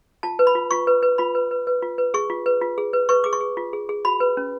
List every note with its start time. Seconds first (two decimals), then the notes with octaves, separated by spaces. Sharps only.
0.23 F4 A5
0.39 B4
0.47 B5
0.55 F4
0.71 F4 C#6
0.87 B4
1.03 B4
1.18 F4 B5
1.35 B4
1.51 B4
1.67 B4
1.82 F4
1.98 B4
2.14 G#4 C#6
2.30 F4
2.46 B4
2.62 F4
2.78 G#4
2.93 B4
3.09 B4 C#6
3.24 G#4 D6
3.33 C#6
3.41 G#4
3.57 F4
3.73 G#4
3.89 G#4
4.05 F#4 B5
4.20 B4
4.37 C#4